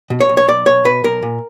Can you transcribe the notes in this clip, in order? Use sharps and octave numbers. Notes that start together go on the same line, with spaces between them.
B2
C#5
B1
C#5
B1 D5
B1 C#5
B2 B4
B1 A#4
A#2